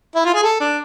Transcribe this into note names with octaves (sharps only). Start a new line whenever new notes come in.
E4
F4
G#4
A4
D4